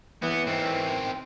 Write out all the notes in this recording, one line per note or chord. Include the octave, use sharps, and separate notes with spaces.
E3 B3
D#3 C4